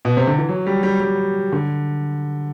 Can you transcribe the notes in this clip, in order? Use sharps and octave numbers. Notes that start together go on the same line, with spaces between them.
B2
C3
D3
E3
F#3
G3
G3
G3
D3